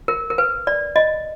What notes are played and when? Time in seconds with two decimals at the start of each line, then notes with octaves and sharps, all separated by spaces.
0.08 A#4
0.30 A#4
0.38 B4
0.67 D5
0.96 D#5